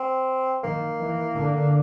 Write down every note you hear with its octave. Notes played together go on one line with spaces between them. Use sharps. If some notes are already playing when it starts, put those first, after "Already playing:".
Already playing: C4
D#3 A#3
E3
D3